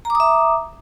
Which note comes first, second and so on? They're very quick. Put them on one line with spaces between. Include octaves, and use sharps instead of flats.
A#5 D6 D#6 E5